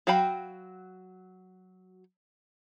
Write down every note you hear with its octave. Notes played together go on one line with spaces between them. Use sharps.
F#3 F#4 F5 G5 B5